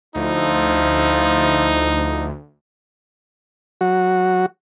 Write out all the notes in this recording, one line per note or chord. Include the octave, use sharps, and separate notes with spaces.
D2 F3 D#4 E4
F#3 F#4